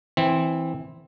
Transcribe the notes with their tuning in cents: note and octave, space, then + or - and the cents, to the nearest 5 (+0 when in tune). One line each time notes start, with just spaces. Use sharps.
E3 -10 C4 +0